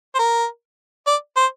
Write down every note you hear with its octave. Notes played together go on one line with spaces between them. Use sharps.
C5
A#4
D5
C5